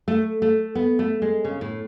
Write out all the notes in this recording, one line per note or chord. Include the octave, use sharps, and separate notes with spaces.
A3
A3
B3
A3
G#3
C#3
A2